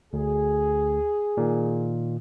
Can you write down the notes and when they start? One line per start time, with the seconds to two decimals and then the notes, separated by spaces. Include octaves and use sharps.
0.13 D2 G#4
1.37 A#2 D#3